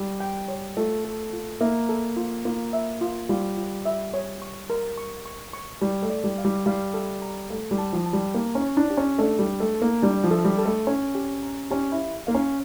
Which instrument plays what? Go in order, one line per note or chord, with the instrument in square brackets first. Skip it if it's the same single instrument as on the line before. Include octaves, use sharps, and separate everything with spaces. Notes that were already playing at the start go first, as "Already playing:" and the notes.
Already playing: [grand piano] G3
[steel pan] G5
C#5
[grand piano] A3 [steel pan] F4
[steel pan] A4
F4
[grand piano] A#3 [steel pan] E5
[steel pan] A4
F4
[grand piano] A#3 [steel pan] F4
[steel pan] E5
F4
[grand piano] G3 [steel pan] F4
[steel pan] F4
E5
C#5
C#6
A#4
C#6
C#6
C#6
[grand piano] G3 [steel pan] D5
[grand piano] A3
[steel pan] D5
[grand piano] G3
[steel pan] F5
[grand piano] G3
[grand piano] G3 [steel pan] F5
[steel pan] A4
A#5
[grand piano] A3 [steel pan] F5
[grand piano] G3
[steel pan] A5
[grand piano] F3
[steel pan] A5
[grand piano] G3
[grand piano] A#3 [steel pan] G4
[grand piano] C#4
[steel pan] C#5
[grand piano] D4
[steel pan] G4
[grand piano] C#4
[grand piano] A3 [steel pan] D4
[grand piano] G3
[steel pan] D4
[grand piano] A3
[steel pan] A4
[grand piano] A#3
[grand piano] G3 [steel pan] D4
[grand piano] F3
[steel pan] A4
[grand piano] G3
[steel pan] A4
[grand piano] A3
[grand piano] C#4 [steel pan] C#5
[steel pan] G4
A#5
[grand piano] C#4 [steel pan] G4
[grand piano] E4
[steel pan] F5
[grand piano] A#3 [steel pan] F5
[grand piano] C#4